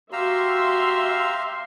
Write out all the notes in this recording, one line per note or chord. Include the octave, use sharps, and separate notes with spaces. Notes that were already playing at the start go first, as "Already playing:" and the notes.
F#4 G4 E5 F5 A#5 C6 E6